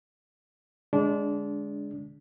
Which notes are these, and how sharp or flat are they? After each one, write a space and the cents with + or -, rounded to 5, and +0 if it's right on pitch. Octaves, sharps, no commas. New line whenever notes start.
D3 +0 G#3 +0 D4 -25